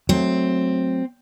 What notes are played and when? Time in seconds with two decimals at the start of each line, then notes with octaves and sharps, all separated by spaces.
0.09 F#3 A3 C4